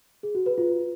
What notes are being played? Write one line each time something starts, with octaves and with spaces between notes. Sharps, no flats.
G#4
F#4
B4
F4